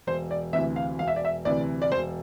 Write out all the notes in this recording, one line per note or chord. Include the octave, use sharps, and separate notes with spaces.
E1 C5
D5
D2 C3 E3 E5
F5
E1 F5
E5
D5
E5
D2 C3 E3 D5
D5
E1 C5